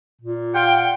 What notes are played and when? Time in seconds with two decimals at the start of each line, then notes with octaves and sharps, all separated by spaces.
0.21 A#2
0.54 F4 F#5 G5